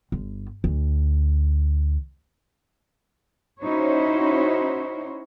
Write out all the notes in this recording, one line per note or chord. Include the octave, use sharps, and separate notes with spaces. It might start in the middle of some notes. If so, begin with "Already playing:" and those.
G1
D2
C#4 D#4 E4 F#4 C5 C#5